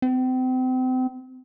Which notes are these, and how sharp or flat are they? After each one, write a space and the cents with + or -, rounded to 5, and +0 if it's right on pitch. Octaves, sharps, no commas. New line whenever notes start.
C4 -35